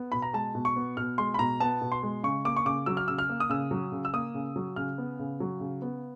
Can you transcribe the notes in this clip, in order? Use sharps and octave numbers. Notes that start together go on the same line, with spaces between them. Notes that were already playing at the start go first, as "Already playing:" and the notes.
Already playing: B3
B2 B5
A#5
G#3 A5
B2
C#6
B3
B2 F6
G#3 C6
B5
B2 A#5
B3 A5
B2
C6
G#3
C#3 C#6
A#3 D6
C#6
C#3 D6
F#3 E6
F6
C#3 E6
F6
A#3
D#6
C#3 E6
F#3
C#3
E6
A#3 D#6
C#3
F#3
C#3 F6
B3
C#3
F#3
C#3
B3